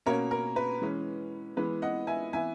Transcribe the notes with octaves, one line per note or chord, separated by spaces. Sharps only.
B2 A#3 C#4 A#4 C#5
A#4
B4
E3 G#3 C#4
E3 G#3 B3 B4
D#5 F#5
E5 G#5
E3 B3 E5 G#5